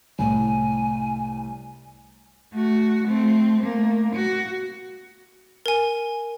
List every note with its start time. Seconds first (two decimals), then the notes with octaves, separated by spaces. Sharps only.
0.19 C2 A2 G#5
2.53 A3 F#4
3.05 A3 C4
3.61 A3 A#3
4.15 F#4
5.66 A#4 G#5